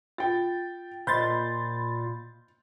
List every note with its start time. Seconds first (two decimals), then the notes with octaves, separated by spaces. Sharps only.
0.18 F4 G5 A6
1.07 A#2 C5 D#5 B5 C6 G6 A6